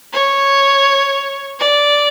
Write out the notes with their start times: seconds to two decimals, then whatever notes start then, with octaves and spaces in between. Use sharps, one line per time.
0.13 C#5
1.59 D5